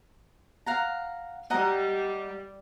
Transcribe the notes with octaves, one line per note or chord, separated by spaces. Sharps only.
F5 F#5 A#5
G3 D#5 F#5 A#5